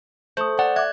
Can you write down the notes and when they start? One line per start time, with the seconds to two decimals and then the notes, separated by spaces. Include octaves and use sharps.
0.37 A3 C5 D#6 G6
0.59 D5 F#5
0.76 E5 D6 F#6 G#6